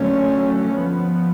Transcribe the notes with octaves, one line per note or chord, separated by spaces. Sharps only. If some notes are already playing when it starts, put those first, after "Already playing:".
Already playing: D3 F#3 A3 C#4
F3 B3